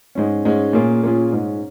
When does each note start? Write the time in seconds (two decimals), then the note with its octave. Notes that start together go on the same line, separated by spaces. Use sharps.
0.15 G#2 G#3 C#4
0.45 G#2 G#3 C#4
0.73 A#2 A#3 C#4 F4 G#4
1.03 A#2 A#3 C#4 F4 G#4
1.32 G#2 G#3 C#4